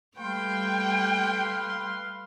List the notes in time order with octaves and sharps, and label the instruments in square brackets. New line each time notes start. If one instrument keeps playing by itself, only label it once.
[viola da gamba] G3 A3 [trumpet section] B4 F5 C6 [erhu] G5